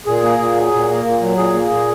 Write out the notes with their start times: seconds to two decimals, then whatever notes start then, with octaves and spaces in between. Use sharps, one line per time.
0.06 A#2 G#4
0.23 A#3
0.39 A#2
0.55 F#3
0.73 A#2
0.88 A#3
1.04 A#2
1.21 F#3
1.37 A#2 G#4
1.54 A#3
1.70 A#2